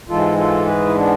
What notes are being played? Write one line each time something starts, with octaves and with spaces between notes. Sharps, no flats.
G#2 E3 G#3 F4 A4
F4 A4
G#4 B4
E4
B3 D4